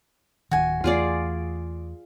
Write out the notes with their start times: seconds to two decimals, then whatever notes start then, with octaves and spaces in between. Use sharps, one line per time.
0.51 D1 D#3 F#4 G#5
0.84 E2 E3 A3 F4 G#4 D5